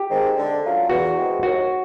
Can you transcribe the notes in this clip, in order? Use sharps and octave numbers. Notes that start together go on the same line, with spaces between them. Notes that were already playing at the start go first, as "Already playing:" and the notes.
Already playing: G4
D#3 G#3 C4
D3
F#3 A3 C#4 F4
E2 F#4
C3 E3 G#3 C4
D#2 F#4